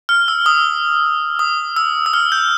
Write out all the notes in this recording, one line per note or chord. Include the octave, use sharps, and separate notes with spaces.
F6
E6
D#6
D#6
E6
E6
F6
G6